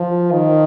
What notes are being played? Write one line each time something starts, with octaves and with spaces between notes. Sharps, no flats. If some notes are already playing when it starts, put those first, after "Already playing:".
Already playing: F3
D#3